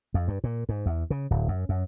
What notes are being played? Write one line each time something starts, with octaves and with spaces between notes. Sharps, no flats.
F2
G2
A#2
G#2
E2
C#3
D1
F#2
F#2